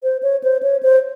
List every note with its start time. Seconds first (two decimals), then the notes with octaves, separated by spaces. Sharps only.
0.03 C5
0.23 C#5
0.44 C5
0.63 C#5
0.83 C5